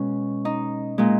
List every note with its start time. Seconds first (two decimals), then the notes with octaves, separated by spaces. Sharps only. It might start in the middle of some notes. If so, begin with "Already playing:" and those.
Already playing: B2 G#3 C#4
0.45 D#4
0.98 A#2 G#3